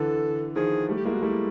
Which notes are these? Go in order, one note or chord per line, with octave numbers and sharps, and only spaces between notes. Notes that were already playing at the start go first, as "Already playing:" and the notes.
Already playing: D3 E3 A4
D#3 F3 G#4
G3 A3
G4
G#3 A#3 E4
F#4
G3 A3 E4